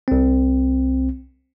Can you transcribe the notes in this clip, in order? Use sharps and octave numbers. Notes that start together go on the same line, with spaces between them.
C2 C4